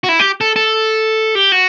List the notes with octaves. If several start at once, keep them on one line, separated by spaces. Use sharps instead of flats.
F#4
E4
G4
A4
A4
G4
F#4